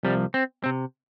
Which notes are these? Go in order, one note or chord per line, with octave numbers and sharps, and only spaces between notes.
C2 C3 F3 G3
C4
C3 C4